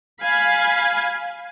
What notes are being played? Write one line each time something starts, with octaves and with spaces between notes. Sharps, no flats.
F5 G#5 B5